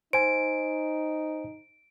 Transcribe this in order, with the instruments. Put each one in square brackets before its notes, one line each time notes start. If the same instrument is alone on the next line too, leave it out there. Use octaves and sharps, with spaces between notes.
[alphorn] D#4 [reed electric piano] C5 G#5 [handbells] D7